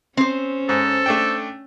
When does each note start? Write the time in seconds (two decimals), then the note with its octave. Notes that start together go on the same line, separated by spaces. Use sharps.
0.17 C4 C#4 C5
0.69 G#2 A4
1.06 A3 D4 G5